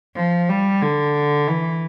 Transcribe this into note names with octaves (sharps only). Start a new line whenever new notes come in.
F3
G3
D3
E3